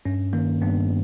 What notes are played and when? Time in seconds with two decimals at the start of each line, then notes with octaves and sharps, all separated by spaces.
0.05 G2 C#4
0.33 D#3 A#3
0.61 G2 B3